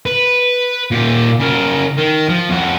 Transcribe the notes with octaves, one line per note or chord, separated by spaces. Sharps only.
B4
A#2 G4
C#3 A#4
D#3
F3
F2 F#4